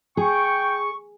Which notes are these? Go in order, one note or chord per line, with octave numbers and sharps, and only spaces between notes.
G#4 G5 C#6